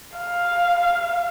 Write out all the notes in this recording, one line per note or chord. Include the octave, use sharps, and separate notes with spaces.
F5